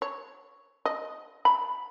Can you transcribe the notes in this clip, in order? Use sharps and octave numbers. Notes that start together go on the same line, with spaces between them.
C#5
D#5
B5